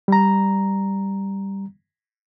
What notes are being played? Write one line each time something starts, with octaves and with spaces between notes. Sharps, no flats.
G3 A#5